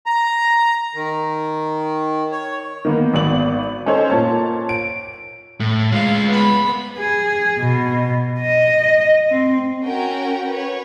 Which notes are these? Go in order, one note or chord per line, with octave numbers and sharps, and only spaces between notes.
A#5
D#3
C#5
D#3 A#3 B3
G#1 B3 D5 F#7
C#4 D#4 A4 C5 C#5
A#2 A#3 C#5 A5
D7
A2
G#3 F4 F5
B3 B5
G#4
B2
D#5
C4
C#4 F#4 A#4 G5
B4 C#5